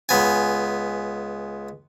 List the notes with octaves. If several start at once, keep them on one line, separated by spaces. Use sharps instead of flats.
C#2 B3 G#5